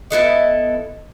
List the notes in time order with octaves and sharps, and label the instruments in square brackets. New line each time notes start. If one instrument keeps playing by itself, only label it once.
[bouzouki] B3 E4 A4 D#5